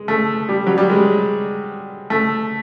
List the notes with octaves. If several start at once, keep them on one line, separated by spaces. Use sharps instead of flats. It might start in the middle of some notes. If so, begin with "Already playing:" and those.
Already playing: G#3
A3
G3
F#3
G3
G#3
A3